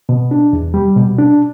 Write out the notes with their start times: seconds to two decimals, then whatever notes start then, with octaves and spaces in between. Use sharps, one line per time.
0.09 B2
0.31 D4
0.53 E2
0.74 G3
0.96 B2
1.18 D4